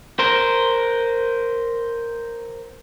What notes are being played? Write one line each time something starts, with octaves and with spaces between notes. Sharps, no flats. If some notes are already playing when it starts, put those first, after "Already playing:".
A#4 C5